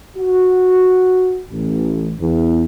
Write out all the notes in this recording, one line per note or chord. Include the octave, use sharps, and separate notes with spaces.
F#4
A1
E2